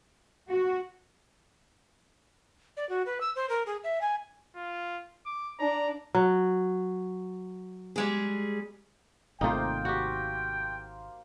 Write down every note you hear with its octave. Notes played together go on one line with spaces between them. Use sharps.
F#4
D5
F#4
B4
E6
C5
A#4
G#4
E5
G#5
F4
D6
D4 D5 A#5
F#3
G3 G#3 G#4
G#1 C3 A3 A#3 D#4 F4 C5 G5
F#4 G4